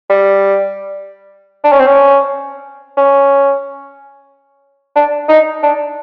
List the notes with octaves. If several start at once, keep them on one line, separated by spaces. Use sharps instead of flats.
G3
D4
C#4
C4
C#4
C#4
D4
D#4
D4